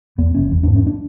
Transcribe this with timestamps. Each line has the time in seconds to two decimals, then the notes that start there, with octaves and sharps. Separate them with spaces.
0.18 E2 B3
0.35 F#1 C#4
0.51 E2
0.63 G#2 D4
0.75 C#4
0.87 D4